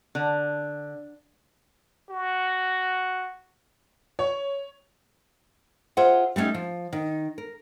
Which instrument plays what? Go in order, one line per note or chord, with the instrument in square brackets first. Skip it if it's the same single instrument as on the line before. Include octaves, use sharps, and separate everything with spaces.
[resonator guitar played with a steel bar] D3
[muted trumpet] F#4
[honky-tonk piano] C#5
[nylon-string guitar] F4 G#4 C5 E5 F#5
G3 A3 A#3 C#4 D#4
F3
D#3
A#4